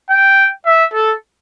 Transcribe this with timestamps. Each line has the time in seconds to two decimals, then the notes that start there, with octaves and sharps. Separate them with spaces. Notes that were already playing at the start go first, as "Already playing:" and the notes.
0.10 G5
0.66 E5
0.94 A4